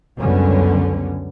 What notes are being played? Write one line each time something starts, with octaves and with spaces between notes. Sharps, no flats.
C#2 F#2 D3 G3 B3 C#4